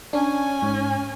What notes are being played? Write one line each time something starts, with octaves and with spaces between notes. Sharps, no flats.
C#4 D4 G#5
G#2